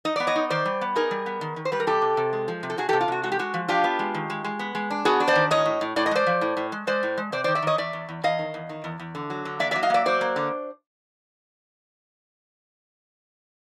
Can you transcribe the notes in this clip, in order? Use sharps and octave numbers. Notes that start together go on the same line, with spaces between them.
D#4 D#5
B3 D5
C#5 D#5
D#4
D#3 C5 D5
G3
B3
D#4 G#4 A#4
G3
B3
D#3
D#3
C5
G3 B4
A#4
C3 G4 A4
C3
C3
G#3
F3
C3
A4
C3 F#4 G#4
G4 A4
C3
F4
C3 F#4
G#3 F#4
G4
G#3 F#4
F3
D4 F4 G4
B3
G#3
D#3
G#3
G#3
B3
G#3
D4
B3 F#4 G#4
D4
C5 D5
D#3
A2 C#5 D#5
A2
A2
A2 D5
D#5
G#3 C5 D5
F3
A2
A2
G#3
G#3 C5 D5
A2
G#3
C3 C5 D5
C5 D5
D#3
D5 E5
D#3 C#5 D#5
E2 D5 E5
E2
E2
E2 D#5 F5
D#3
E2
D#3
E2
E2
D3
F#3
D3
A#3 D5 E5
D5 E5
F#3
D#5 F5
A#3 D5 E5
F#3 C5 D5
A#3
D3